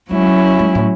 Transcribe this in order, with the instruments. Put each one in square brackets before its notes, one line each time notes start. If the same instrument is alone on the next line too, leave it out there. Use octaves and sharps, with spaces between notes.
[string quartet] F#3 C#4 E4 [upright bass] G#3
[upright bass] G#3
A2